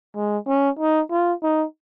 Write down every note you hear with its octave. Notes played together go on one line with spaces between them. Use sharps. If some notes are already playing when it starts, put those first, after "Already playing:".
G#3
C#4
D#4
F4
D#4